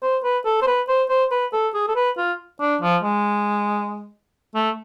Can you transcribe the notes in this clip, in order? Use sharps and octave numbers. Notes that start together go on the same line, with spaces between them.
C5
B4
A4
C5
B4
C5
C5
B4
A4
G#4
A4
B4
F4
D4
F3
G#3
A3